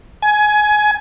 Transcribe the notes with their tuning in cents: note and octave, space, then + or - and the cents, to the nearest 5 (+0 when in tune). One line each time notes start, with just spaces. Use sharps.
G#5 +20